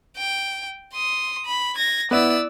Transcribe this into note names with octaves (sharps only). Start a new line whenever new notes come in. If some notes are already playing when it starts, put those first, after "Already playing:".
G5
C6 D#6
B5
G#6 A#6
B3 E4 D5 E6